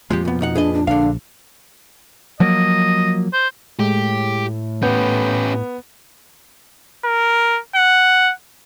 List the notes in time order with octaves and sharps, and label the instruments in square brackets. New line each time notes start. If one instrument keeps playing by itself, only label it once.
[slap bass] F2 A#2 F3 [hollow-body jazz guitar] G#3 G4
[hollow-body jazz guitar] B1 B3
B2 D#4 F#5
[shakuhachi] D4 [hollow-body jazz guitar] G#4 B4 D#5
[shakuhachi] D4
[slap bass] A#1 [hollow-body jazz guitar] D3 F5 [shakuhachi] D4
[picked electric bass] F3 F#3 A#3 [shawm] D#5
[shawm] C5
[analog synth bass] A2 [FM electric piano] G#3 [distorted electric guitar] G4
[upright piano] B3 [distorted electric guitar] C#4 G4 [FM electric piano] G6
[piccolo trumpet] A#4
F#5